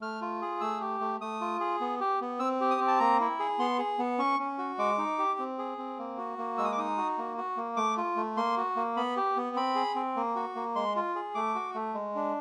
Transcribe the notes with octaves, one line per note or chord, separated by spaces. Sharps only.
A3 F6
F4
G#4
A3 E6
G4
A3
A3 D#6
F4
G#4
B3
G4
B3
C4 E6
G4
D#6
C4
A5
A#3 A#5
E4
G#4
B3 C6
G#4
B3
C#4 C#6
C#4
F#4
G#3 D6
D#4
G4
C4
G#4
C4
A#3
F#4
A#3
G#3 E6
D#6
D6
D#4 D#6
F#4
A#3
F#4
A#3
A3 D6
F4
A3
A#3 C6
F#4
A#3
B3 B5
G4
B3
C4 B5
G#4
C4
A#3
F#4
A#3
G#3 C6
F4
G#4
A3 D6
F#4
A3
G#3
D4